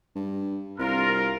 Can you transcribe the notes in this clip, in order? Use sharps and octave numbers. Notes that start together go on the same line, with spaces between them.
G2
C2 F4 A#4